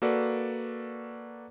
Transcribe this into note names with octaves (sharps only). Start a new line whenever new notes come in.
A#3 F#4 A4 B4 D5